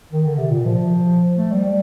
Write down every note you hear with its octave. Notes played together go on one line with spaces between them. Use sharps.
D#3
D3
C3
A#2
F3
A3
G3